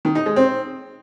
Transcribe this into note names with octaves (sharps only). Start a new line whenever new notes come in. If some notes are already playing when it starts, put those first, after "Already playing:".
D#3
D#4
G#3
C4